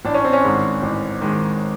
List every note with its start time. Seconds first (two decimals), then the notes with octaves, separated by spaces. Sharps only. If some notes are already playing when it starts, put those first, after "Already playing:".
0.05 A1 D4
0.14 C#4
0.25 C4
0.33 C#4
0.44 G#2 D#3 G#3
0.82 A1
1.22 D#3 G#3